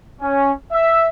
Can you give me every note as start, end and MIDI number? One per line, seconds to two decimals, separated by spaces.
0.22 0.53 61
0.72 1.09 76